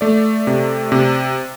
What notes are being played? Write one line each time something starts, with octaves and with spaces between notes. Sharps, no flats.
A3 D5
C3
C3